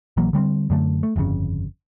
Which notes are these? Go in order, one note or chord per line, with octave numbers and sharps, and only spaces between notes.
A#1 E3 F#3 A#3
D3 G3 A#3 C4
F#2 D3 A3
A3
G1 F2 A2 C#3